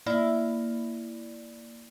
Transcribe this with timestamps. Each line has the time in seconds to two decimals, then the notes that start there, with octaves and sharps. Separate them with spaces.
0.06 A#3 E4 D5